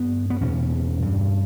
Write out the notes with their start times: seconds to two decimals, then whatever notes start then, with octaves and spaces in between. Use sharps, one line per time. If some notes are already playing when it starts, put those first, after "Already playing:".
Already playing: G2 B3
0.30 B3
0.41 E2 B2 C#4
1.02 G2